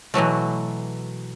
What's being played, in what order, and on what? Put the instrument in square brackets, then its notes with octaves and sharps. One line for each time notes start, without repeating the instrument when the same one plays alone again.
[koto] B2 E3 F#3 A3